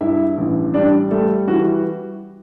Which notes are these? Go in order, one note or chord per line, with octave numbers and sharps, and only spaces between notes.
G2 E4 E5
A1
G3 D4 D5
G3 A3 A4
E3 F#4